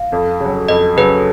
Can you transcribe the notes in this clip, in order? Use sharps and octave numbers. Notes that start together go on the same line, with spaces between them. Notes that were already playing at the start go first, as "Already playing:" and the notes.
Already playing: F5
F2
C#3 F#3
F2 D#5
C#3 F#3 B4